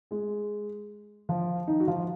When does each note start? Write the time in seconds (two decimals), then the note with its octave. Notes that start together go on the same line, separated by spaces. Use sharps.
0.11 G#3 G#4
1.29 F3 F4
1.68 D#3 D#4
1.80 F#4
1.88 F3 F4